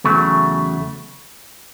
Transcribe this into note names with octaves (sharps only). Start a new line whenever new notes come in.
E2 C#3 F#3 A3